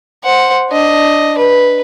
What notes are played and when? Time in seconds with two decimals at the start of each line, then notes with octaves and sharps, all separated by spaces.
0.24 C5 F#5
0.70 D4 D#5
1.38 B4